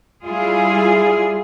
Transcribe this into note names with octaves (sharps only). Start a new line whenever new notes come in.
G3 E4 F4 G#4